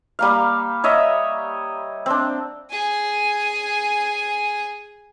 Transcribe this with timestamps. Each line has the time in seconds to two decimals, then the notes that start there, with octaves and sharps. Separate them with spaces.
0.19 G3 A#3 F5
0.84 C#5 D#5 E5
2.06 C4 D4
2.70 G#4 G#5